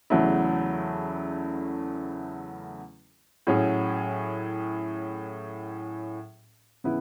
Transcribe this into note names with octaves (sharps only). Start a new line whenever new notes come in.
E2 C#3 F#3 A3 E4
A2 F#3 C#4 G#4
C#3 E3 B3 E4